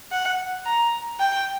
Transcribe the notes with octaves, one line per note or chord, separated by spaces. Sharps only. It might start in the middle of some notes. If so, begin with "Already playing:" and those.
F#5
A#5
G5